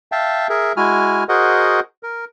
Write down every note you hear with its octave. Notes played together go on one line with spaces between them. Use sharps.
E5 F5 G5 A5
G#4 A#4 E5
G#3 E4 F#4 G#5 F6
F#4 G#4 A#4 C5 D#5 F#5
A#4